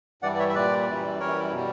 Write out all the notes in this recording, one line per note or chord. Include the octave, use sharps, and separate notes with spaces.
G2 E3 G3 D5 F#5
D5
C#5 E5
E5
A#2 G3 B4 D5
F#2 E3 G3
F#2 E3 G3 A#4 C#5
B2 G3